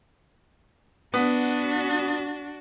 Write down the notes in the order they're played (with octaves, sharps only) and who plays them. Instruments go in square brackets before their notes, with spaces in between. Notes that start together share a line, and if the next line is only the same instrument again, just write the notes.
[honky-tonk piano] B3 [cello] D4 F#4